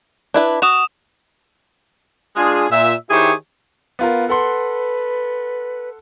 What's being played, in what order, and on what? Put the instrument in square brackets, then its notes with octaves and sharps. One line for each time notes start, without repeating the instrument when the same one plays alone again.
[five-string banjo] D4 E4 B4
[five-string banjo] F#4 [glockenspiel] D#6 E7 F7
[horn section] G#3 D4 F4 G#4
A#2 E5
D#3 E4 G4 G#4 C5 C#5
[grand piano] B3 F4 A#4
[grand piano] A4 F#5 C6 [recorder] B4